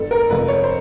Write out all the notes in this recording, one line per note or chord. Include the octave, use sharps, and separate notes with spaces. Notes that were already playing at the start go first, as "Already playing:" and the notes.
Already playing: G1 A4
A#4
F2 C3 F3 B4
C#5
C5